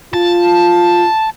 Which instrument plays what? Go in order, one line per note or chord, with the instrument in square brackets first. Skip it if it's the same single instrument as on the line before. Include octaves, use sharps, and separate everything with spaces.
[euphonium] F4 [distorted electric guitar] A5